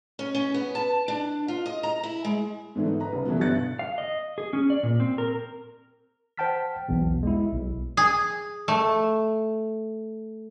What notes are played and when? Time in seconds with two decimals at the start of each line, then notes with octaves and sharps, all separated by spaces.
0.19 C#4
0.35 C#4
0.54 B3
0.75 A5
1.08 D4
1.48 F4
1.66 D#5
1.83 A#5
2.03 E4
2.25 G#3
2.76 G#2 D3 E3 A3
2.88 D#4
3.00 B4 A#5
3.12 C2 C#3
3.25 B2 E3 F#3 G3 A3 B3
3.41 G1 B2 D3 F#6 A6 C#7
3.79 F5
3.98 D#5
4.38 G#4
4.53 C#4
4.70 D5
4.83 A#2
5.00 C4
5.18 A#4
6.37 C5 F#5 G5 A5 F6 B6
6.88 B1 E2 B2
7.23 G#3 B3 E4
7.52 B1
7.97 G#4
8.68 A3